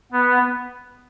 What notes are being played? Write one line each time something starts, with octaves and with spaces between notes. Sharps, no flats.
B3